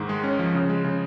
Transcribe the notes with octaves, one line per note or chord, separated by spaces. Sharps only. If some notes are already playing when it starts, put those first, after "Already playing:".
Already playing: G#2 D#3
G#3
C#4
F3
C#3
G#3
C#3